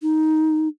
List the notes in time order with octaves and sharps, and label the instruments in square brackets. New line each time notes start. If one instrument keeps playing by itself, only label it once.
[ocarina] D#4